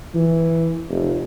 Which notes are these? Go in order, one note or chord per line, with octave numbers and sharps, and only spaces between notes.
E3
F1